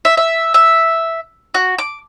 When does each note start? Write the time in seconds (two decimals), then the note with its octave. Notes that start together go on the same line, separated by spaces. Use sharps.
0.05 E5
0.17 E5
0.54 E5
1.54 F#4
1.78 D6